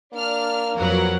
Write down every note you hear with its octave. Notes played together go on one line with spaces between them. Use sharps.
A#3 D4 F6
F2 F#3 A#4 B4 F#5